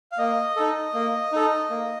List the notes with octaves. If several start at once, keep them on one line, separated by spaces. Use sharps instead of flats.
F5
A#3 D#5
D#4 A4
A#3
D#4 A4
A#3